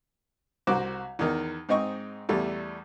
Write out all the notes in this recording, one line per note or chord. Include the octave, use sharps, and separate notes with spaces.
C2 F#4 C5 A#5 D6
E2 D#3
G#2 C4 D#4 D#5 C#6
E2 G3 A3